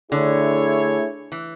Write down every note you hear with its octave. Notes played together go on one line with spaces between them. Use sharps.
D3 A3 E4 G#4 C#5
E3